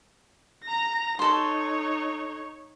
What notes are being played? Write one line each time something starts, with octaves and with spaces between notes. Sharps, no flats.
A#5 A#6
D#4 A4 C#5 C6